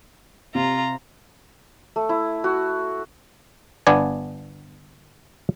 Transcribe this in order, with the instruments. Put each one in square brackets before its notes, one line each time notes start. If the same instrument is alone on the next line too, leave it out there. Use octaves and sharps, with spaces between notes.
[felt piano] C3 [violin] F4 A#5
[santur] A3
E4
F#4
[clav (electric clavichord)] G1 B3 D4 D5 G#5